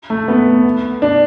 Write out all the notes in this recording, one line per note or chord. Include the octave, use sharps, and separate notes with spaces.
A3
B3
D4